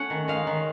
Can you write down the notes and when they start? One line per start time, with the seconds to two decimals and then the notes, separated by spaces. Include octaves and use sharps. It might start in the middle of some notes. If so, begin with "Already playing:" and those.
Already playing: A3 C#4 F#5
0.10 D#3
0.28 G#3 F5
0.47 D#3